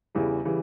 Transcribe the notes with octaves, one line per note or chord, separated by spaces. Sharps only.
E2 C#3 E3 G3
C#3 E3 G3